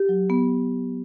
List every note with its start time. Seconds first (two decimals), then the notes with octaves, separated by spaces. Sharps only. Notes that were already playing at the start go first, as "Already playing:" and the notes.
Already playing: G4
0.09 F#3
0.30 B3